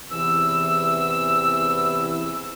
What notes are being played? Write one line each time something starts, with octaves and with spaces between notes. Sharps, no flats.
E2 C3 E3 E6